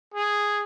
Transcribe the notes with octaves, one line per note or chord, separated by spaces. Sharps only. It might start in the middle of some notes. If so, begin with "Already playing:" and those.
G#4